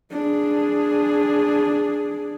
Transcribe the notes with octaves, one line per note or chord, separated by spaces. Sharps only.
D4 G#4